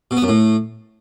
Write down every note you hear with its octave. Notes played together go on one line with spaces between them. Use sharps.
B2
B3
F#2
A2